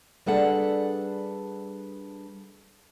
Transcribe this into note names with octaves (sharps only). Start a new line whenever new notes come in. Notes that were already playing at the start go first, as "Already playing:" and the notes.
G3 D4 G#4 A4 B4 F#5